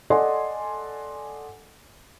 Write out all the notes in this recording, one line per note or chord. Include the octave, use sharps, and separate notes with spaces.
A4 D5 D#5 F#5 G#5 C6